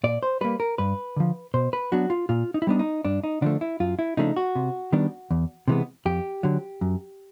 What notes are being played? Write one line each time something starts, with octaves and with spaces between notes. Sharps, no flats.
A#2 D5
C5
G3 A#3 B4
A#4
G2 B4
D3 F3
B2 C5
B4
F#3 B3 D4 F#4
F4
A#2 F4
D#4
E4
G3 B3 D4 D#4
D#4
G2 D4
D#4
D3 F3 A3 D4
E4
F#2 F4
E4
C#3 F3 A3 D4 D#4
F#4
C3
D#3 G3 B3 D4
E2
C3 E3 G#3 B3
F2 G4
D3 F#3
F#2